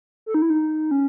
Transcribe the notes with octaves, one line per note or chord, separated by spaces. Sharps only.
A4
D#4
E4
D#4
C#4